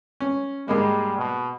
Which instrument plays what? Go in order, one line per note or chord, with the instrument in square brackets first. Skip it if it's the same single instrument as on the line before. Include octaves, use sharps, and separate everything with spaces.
[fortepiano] C#4
[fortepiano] G#2 G#3 A#3 [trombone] G3
[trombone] B2